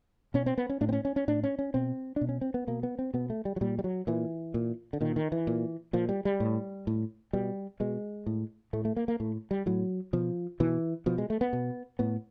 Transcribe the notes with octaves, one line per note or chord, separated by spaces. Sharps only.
B2 C#4
C4
B3
C#4
A2 D4
C4
C#4
C#4
C#4
A2 D4
C#4
C#4
B2 C4
D4
B2
C#4
C4
B3
B2 A#3
B3
C4
B2 B3
A3
G3
F#3
A#2 G3
G3
F#3
A#2 E3
A#2
D3
A#2 D#3
D#3
E3
A#2
A#2 F3
G3
G3
A2
A2
B2 G3
B2 G#3
A2
A2 A3
A3
A#3
A#3
A2 A3
G3
A2 F#3
B2 F3
B2 E3
B2 F3
G#3
A3
B3
B2
A2 B3